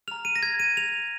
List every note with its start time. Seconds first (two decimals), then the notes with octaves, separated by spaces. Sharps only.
0.08 A#5 F6 F7
0.25 D#7
0.36 A#6
0.43 G#6
0.60 D#7
0.77 F7